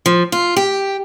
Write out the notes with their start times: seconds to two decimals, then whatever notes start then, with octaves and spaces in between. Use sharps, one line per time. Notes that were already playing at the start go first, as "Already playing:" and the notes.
0.06 F3
0.32 F4
0.56 G4